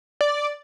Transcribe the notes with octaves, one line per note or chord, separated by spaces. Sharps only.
D5